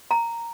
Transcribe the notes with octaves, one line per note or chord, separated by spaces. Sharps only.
A#5